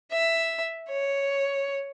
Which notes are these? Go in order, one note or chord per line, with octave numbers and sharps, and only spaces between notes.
E5
C#5